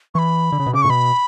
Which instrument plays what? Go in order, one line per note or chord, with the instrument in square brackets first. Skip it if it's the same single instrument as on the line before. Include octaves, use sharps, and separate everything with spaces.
[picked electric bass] E3 [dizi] B5 C#6
[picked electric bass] D3
C#3
B2
[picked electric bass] C#3 [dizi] D6
[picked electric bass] A2 [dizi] C#6
[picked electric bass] B2 [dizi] B5